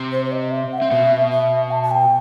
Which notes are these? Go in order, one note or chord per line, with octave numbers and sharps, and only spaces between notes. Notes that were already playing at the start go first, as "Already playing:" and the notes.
Already playing: C3 C4
C5
C5
D#5
E5
F#5
C4 E5
B2 B3
E5
A5
A5
G5